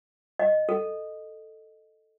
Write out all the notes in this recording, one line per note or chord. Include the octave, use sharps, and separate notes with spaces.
D#5
A4